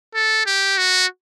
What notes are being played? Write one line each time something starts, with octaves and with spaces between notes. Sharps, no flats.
A4
G4
F#4